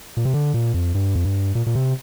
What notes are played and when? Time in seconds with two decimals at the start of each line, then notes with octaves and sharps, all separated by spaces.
0.17 A#2
0.25 C3
0.34 D3
0.54 A#2
0.74 F2
0.95 G2
1.15 F2
1.25 G2
1.55 A#2
1.67 A#2
1.75 C3